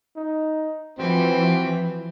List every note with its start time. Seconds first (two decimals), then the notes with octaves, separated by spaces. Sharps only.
0.16 D#4
0.99 E3 F3 C4 F#4